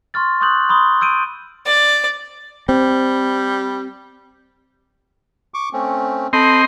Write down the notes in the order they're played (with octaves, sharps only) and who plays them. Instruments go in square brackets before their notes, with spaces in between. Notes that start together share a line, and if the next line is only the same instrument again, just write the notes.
[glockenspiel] C6 C#6 F6 A6
C6 C#6 D#6 F#6 G6 F#7
B5 C6 D#6 G7
E6 G6 D7 D#7
[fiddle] D5
[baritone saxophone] G3 [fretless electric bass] C4
[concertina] C#6 D6
A3 C4 C#4
[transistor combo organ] C4 D#5 C6 [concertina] A4 B5